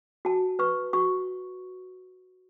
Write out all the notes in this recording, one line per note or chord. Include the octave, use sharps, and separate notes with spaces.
F#4 A5
B4 C#6
F#4 C#6